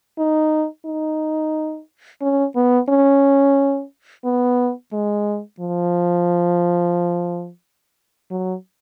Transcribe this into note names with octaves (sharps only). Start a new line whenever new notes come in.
D#4
D#4
C#4
B3
C#4
B3
G#3
F3
F#3